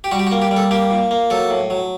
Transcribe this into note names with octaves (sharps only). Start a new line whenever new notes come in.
G4
G3 F#4
G4
F#4
A#3
G4
G3
A4
A#3 G4
A#2
A#3
F#3 A4
A2
F#3